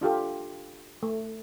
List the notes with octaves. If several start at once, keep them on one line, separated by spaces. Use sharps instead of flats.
D4 F4 G4 A4
A3